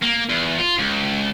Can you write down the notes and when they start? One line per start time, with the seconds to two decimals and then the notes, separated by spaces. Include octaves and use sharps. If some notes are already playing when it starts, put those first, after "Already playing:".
0.03 A#3
0.29 E2
0.59 F4
0.79 C#2